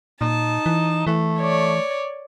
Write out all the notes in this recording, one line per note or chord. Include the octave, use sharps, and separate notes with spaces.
A#2 D#4 A5
E3
E3 A3
C#5 D5